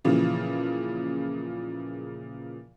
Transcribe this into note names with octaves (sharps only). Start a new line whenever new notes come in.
A#2 C#3 E3 F3